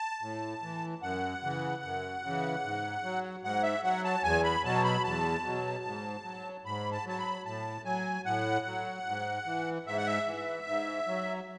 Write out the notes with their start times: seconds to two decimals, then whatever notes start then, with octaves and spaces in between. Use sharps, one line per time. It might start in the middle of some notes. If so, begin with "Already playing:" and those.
Already playing: A5
0.22 A2
0.62 E3
1.02 F#2 F#5
1.43 C#3 E3
1.83 F#2
2.23 C#3 E3
2.64 G#2
3.04 F#3
3.43 G#2 F#5
3.63 E5
3.83 F#3 F#5
4.04 A5
4.23 E2 G#5
4.44 B5
4.64 B2 F#3 A5
4.84 B5
5.04 E2 A5
5.44 B2 F#3
5.85 G#2
6.24 F#3
6.65 G#2 B5
6.92 A5
7.06 F#3 A5
7.18 B5
7.45 A2 A5
7.85 F#3 G#5
8.25 A2 F#5
8.66 F#3
9.06 G#2
9.46 E3
9.86 G#2 E5
9.97 F#5
10.07 E5
10.27 E3
10.67 G#2
11.08 F#3